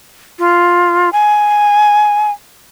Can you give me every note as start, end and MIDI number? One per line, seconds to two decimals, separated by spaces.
0.39 1.10 65
1.13 2.31 80